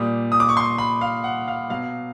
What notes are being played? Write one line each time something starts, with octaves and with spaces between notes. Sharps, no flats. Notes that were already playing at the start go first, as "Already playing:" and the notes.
Already playing: A#2 G3 D#6
D#6
D6
C#6
C6
B5
F5
F#5
F5
B2 F#3 F5